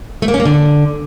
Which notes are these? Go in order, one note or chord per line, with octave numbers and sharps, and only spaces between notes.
A3
A#3
C#4
A#3
D3